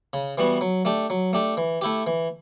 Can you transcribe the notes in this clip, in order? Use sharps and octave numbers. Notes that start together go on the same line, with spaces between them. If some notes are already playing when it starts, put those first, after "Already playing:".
C#3
E3 G3 B3 F#4
F#3
A3 D4 G4
F#3
A3 D4 G4
E3
A3 E4 G4
E3